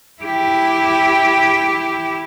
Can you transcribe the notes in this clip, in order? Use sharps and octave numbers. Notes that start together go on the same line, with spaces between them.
E4 G4